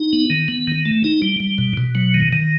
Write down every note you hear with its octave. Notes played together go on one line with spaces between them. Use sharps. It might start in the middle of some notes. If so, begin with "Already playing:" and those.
Already playing: D#4
B3
D#3
B3
D#3
A3
D#4
G3
G3
B2
B2
F#3
D#3
D#3